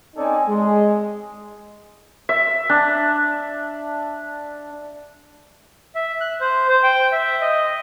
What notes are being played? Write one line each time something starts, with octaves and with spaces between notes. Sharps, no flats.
C4 C#4 D#4 A4 D5 G#5
G#3
E5
D4
E5
F#6
C5
C5
G5
E5
D#5